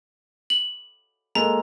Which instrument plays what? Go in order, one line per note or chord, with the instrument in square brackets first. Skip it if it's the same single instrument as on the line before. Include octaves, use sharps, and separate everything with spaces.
[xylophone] F#7
[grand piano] G#3 A#3 A4 [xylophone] A#5